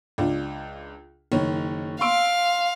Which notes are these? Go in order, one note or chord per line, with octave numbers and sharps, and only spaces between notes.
C#2 D4 F4
F#1 D#3 C#5
F5 C6 E6 D7